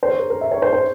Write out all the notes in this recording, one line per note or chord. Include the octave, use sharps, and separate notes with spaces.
C5
C#5
A#4
A#4
E5
C#5
C5
C5